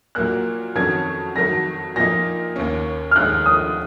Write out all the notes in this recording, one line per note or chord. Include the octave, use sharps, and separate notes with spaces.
A#2 F#3 A#3 F#6
F2 D#3 F#3 C#4 G#6
F2 D#3 F#3 A#6
A#2 F3 A#3 D#4 A#6
D#2 D#3 A#3 C#4
F6
D#2 D#3 G#3 D#4 F#6
D#6